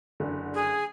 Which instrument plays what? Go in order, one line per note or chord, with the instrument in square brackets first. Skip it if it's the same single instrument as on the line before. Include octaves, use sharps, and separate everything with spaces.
[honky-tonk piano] F#1 D3
[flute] G#4